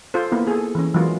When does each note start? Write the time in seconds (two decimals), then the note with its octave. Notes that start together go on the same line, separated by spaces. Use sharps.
0.14 F4 A4 C5
0.32 A#3 B3 E4
0.47 G#4 A4
0.75 E3 C#4
0.94 E3 F#3 G#3 F4 F#4 A#4